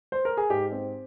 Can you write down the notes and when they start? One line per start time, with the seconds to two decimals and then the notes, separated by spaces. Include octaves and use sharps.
0.12 C5
0.25 A#4
0.37 G#4
0.50 G#2 G4
0.72 C4